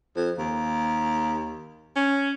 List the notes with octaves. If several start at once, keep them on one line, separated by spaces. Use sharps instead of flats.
F2
D#2
C#4